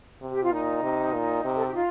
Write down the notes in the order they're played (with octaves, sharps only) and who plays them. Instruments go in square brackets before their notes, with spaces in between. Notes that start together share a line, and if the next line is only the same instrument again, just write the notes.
[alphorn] C3
[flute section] G4
F4
[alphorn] A#2 [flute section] D#4
[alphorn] C3
A#2
C3
[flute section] A4
G4
F4